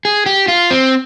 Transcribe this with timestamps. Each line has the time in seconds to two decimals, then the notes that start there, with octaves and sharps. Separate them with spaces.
0.05 G#4
0.26 G4
0.48 F4
0.71 C4